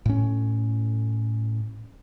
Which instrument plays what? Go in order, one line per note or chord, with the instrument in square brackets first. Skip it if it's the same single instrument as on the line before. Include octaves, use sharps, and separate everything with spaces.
[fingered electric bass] A2 C#4